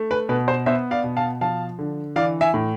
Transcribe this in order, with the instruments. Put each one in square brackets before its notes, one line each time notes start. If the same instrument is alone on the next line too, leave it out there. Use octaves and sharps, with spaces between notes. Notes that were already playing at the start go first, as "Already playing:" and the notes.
Already playing: [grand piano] A3
B4
B2 B4
C5
B3 C5 E5
D5 F5
B2
F5 A5
F3 F5 A5
D3
E3 D5 F5
E5 G#5
A2